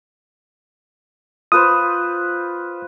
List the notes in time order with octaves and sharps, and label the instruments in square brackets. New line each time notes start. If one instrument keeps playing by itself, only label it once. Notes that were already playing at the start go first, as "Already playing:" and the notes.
[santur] F4 B4 C5 [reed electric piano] D#6